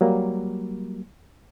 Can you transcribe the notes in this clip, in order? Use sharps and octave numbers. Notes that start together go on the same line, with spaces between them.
F#3 G3 A#3